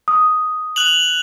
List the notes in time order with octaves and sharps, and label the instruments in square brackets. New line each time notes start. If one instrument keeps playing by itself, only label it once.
[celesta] D#6
[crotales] F#6 F7 F#7